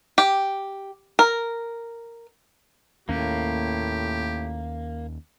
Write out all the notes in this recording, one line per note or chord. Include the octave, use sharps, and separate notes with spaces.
G4
A#4
D#2 A2 A#3 C#4 G4